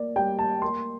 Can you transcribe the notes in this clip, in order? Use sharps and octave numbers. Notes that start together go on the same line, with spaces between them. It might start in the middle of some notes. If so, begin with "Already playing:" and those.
Already playing: A#3 D5
G3 G5
A5
A#3 C6